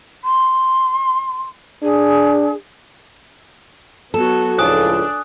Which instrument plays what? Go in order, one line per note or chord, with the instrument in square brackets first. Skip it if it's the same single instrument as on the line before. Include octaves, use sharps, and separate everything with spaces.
[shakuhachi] C6
[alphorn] D4 [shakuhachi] G#4
[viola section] F#3 B3 F#4 [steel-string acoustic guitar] A4
[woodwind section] C#2 A2 F3 [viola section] D4 [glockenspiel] G#5 D#6 F#6